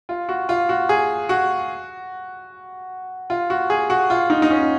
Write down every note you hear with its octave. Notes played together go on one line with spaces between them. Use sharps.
F4
F#4
F4
F#4
G#4
F#4
F4
F#4
G#4
F#4
F4
D#4
D#4
C#4